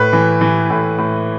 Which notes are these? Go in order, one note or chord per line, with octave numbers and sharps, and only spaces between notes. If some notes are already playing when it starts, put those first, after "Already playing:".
Already playing: A2 B4
E3
E3
A2
A2